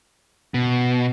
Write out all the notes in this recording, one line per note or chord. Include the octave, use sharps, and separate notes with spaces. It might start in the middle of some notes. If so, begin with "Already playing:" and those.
B2